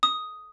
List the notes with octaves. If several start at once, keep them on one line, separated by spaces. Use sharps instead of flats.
D#6